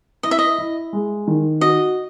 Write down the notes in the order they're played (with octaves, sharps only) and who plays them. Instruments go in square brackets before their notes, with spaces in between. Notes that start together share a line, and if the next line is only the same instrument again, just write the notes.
[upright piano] E4 [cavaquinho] D#5
[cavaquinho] E5
D#5
[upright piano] E4
G#3
D#3
[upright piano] F#4 [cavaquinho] D#5